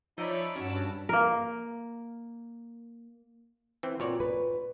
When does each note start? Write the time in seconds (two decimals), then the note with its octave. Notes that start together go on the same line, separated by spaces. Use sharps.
0.18 F3 D#4 C#5 D5 E5 B5
0.56 G2 C#4 F#4 A5 E6
1.09 A#3 A#4
3.83 E3 C4
4.00 A#2 C4 F#4 C#5 D5
4.20 B4